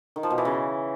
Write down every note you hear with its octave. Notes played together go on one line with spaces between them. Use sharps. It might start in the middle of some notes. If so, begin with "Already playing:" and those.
D#3
F3
B2
E3
C#3